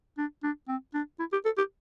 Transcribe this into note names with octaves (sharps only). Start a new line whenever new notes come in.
D4
D4
C4
D4
E4
G4
A4
G4